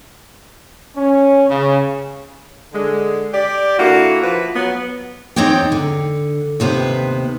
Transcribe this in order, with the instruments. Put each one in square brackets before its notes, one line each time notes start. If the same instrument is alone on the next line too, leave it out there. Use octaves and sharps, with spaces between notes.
[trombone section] C#4
C#3
[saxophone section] D3 G#3
G4 D5
D3 A#3 E4 F#4
F3 B4
F#3 B3
[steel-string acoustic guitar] E2 C4 D#4 C#5 D5 G5
D3
D#2 C3 B3 B4 C5